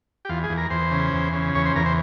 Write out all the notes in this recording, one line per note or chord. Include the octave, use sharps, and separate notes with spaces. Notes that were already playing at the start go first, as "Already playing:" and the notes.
G4
E2 F4
G#4
E2
A#4
E2 C5
C#3
E2
C#3
E2 C#5
C5
E2 A#4
C5